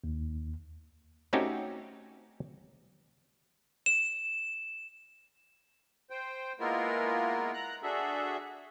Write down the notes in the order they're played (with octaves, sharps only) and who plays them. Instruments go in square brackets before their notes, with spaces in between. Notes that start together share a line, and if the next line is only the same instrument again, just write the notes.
[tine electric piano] D#2
[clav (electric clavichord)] A3 C4 C#4 D#4 F#4 G4
[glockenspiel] E7
[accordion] C5 G5
G#3 A#3 B3 E4 F4 A#4
A#5 F#6
D4 F#4 G#4 A4 E5